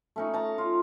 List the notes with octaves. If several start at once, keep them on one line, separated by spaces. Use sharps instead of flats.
A3 C#4 D#4
A5 A#5
F4